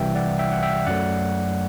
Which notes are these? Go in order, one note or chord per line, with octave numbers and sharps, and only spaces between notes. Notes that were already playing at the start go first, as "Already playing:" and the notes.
Already playing: C2 C3 E3 G3 E5 G5
D5 F#5
E5 G5
F#5
E5 G5
F#2 F#3 A3 D5 F#5